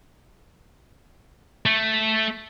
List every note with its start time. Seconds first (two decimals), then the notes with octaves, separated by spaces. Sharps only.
1.66 A3